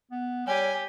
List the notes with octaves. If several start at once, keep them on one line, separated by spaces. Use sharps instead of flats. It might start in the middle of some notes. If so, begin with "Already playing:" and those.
B3
G3 G4 C#5 G#5